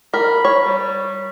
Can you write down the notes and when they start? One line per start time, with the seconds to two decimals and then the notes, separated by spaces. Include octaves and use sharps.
0.14 A#4 B5
0.45 C#5
0.64 G3